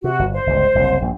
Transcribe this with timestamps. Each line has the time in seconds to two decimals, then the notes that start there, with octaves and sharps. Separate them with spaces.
0.04 C3 F#4
0.19 G1
0.33 C5
0.47 G1 C#2
0.75 F#1 C2
1.02 A#1 G2 A#2